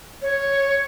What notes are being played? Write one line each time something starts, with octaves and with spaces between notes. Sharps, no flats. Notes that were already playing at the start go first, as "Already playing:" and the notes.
C#5